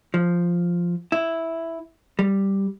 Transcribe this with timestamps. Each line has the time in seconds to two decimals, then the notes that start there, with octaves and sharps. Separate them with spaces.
0.14 F3
1.12 E4
2.19 G3